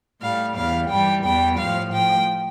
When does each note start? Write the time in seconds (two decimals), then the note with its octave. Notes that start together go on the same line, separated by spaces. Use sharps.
0.22 A2 G3 F5
0.55 E2 E3 G3 F5
0.89 G2 E3 G3 G5
1.24 E2 E3 G3 G5
1.58 A2 F3 F5
1.92 A2 F3 G5